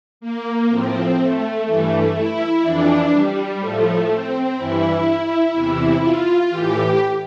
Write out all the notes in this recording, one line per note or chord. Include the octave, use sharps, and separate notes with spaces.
A#3
A2 F3 C4
A3
G2 E3 A3
E4
F2 E3 D4
G3
A2 F3 A3
C4
G2 E3 E4
E2 C3 E3
F4
A2 E3 G4